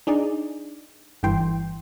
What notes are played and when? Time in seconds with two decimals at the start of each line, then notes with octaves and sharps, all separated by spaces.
0.07 D4 D#4 G#4 D5
1.23 G1 G2 E3 G5 C6